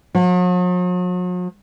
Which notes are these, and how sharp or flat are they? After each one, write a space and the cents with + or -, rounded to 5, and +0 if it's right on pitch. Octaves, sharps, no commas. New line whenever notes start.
F#3 -45